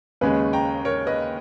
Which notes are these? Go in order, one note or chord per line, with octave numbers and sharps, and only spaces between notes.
D#2 C#3 G#3 C#4 G#4 B4
G5 A#5
A#4 C#5
B4 D#5